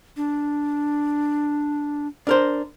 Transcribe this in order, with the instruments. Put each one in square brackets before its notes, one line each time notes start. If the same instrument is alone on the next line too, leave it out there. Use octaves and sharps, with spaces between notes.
[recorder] D4
[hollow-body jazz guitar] D4 A#4 C5